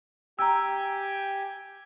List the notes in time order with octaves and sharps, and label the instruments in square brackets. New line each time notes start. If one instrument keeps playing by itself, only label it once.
[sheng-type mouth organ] G4 G5 G#5 [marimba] A#5 E6